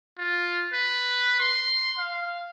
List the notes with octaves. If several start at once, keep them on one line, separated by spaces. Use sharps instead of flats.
F4
B4
C6
F5